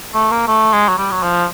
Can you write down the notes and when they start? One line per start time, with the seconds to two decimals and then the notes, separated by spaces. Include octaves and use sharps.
0.15 A3
0.31 A#3
0.48 A3
0.73 G#3
0.89 F#3
0.98 G3
1.12 F#3
1.23 F3